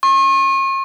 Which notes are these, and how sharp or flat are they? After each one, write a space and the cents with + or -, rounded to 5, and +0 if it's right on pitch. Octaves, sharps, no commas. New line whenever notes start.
C#6 -45